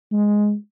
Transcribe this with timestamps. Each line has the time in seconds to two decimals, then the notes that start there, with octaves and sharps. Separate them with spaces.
0.12 G#3